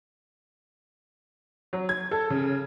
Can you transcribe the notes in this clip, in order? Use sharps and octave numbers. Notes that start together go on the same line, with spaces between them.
F#3
G#6
A4
C#3